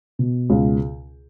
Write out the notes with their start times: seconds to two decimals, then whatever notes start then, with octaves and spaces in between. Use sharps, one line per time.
0.19 B2
0.50 C#2